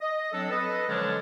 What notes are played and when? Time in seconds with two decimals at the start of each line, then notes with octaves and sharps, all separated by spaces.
0.01 D#5
0.32 F#3 C4 D4 A4
0.50 A4 B4 D#5
0.88 D3 F3 F#3 G#3 C#4 D4